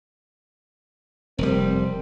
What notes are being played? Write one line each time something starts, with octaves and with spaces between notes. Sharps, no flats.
F1 G3 C4 A#4